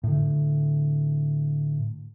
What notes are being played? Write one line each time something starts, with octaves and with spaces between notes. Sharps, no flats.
A2 D3